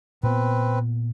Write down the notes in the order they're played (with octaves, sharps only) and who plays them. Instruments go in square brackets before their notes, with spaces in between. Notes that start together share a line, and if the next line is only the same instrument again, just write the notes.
[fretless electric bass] A#2 B3 [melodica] C4 B4